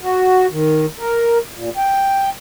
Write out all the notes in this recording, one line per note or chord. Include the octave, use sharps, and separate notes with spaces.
F#4
D#3
A#4
A#2
G5